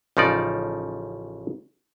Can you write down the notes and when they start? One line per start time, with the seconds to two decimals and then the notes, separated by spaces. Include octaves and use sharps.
0.17 A1 C#3 F3 D#4 D5